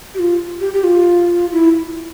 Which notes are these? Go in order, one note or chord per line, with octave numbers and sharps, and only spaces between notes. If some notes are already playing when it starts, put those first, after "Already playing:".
G4
F4
G4
G4
F4
E4